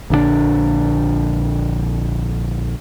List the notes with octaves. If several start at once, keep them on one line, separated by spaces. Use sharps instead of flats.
A#1 D3 F3 D4